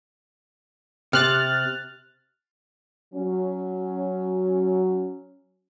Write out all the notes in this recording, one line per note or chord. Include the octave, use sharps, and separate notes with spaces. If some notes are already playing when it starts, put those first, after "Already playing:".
C3 F6 F#6 A6
F#3 C#4